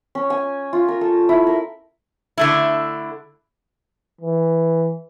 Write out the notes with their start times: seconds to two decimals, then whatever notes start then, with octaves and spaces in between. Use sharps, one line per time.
0.15 C#4
0.30 G#5
0.73 F4
0.88 A#4
1.01 A4
1.29 E4
1.47 A#4
2.38 D3 A3 E4
4.21 E3